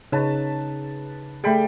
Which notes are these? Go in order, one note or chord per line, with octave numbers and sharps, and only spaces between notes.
C#3 D#4 B4 C#5 A5
G3 A3 G#4 G5 B5